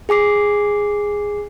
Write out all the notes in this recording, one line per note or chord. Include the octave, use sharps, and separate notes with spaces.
G#4 G#5 D6 C7